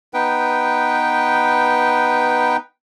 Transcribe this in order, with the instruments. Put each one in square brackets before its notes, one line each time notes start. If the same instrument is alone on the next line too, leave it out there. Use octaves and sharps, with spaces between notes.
[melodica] B3 D#4 B4 G5